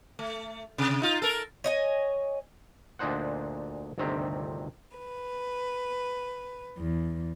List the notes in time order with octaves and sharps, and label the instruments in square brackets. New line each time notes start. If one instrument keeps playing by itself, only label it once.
[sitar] A3
C3
D#4 F4
A4 A#4
[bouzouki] C#5 D#5 G#5
[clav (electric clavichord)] D2 A#2 D4 D#4 C5 F#5
G1 D2 C3 D#3 C4 G4
[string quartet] B4
E2